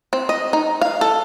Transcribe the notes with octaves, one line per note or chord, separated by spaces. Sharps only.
C4
D#5
D#4
F5
A4